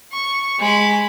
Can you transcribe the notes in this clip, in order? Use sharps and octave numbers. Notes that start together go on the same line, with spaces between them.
C#6
G#3 B5